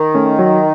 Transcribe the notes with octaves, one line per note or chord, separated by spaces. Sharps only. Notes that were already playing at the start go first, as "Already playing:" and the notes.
Already playing: D#3
A3 C#4
F#3